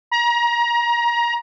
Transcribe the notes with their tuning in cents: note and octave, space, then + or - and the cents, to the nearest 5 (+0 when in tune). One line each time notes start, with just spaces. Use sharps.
A#5 +25